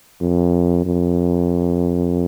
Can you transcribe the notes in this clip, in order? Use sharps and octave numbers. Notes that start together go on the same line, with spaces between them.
F2
F2